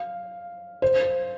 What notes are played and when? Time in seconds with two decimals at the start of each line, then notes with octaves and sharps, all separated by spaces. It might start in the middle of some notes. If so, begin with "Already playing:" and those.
Already playing: F5
0.82 C5